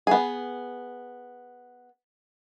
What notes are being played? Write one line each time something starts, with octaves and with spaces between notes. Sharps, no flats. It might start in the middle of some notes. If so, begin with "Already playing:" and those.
B3 G#4